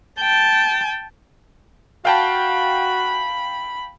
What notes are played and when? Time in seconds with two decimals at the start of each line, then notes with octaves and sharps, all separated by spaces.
0.20 G5 A5
2.05 F#4 F5 G5 A5 B5